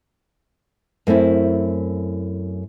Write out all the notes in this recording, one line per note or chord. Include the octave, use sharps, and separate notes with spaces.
F#2 A3 C4 E4